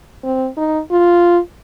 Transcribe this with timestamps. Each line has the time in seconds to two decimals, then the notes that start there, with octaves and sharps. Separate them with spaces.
0.24 C4
0.57 D#4
0.91 F4